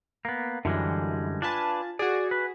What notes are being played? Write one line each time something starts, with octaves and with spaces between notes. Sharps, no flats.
A#3 B3
F#2 D3 E3 G3 G#3
D4 F4 B4 G#5 A5
F#4 G#4 D5
B4